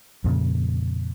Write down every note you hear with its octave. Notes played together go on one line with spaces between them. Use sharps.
F2 A#2 C#3